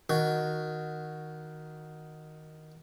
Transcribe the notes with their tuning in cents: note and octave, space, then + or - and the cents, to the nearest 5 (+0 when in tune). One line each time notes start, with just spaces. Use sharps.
D#3 +0 F#4 -5